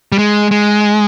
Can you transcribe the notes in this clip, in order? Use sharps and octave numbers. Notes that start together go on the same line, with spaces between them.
G3
G#3
G#3